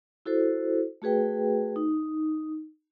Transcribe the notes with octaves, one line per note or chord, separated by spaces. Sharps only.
E4 F#4 A4 C5
A3 F#4 G#4 B4 G5
D#4